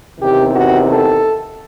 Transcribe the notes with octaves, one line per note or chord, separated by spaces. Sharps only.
E2 C3 D#3 G4
F#4
A4